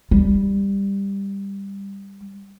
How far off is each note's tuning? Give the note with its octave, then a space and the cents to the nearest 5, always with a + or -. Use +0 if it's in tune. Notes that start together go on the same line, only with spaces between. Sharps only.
G3 +15